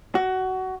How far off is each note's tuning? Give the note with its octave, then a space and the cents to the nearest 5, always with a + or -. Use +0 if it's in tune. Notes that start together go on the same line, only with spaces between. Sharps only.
F#4 +20